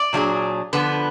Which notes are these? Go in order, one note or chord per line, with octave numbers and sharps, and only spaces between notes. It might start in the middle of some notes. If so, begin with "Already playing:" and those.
Already playing: D5
A#2 F#3 D4 F4 G#4
D3 F3 B3 B4